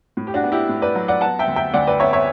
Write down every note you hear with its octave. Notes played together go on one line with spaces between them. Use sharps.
A2
G4
D4 F#4
B3
E4 G4
A2
B4 D5
F#3
D5 F#5
B3 F#5 A5
E5 G5
D2
E5 G5
D2 D5 F#5
B4 D5
B3 C#5 E5
C#5 E5